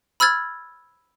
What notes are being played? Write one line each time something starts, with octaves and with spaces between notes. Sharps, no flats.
B5 E6 F6 G#6 A6